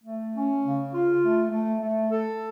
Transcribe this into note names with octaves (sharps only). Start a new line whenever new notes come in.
A3
C#4
C#3
F4
A3
A3
A3
A4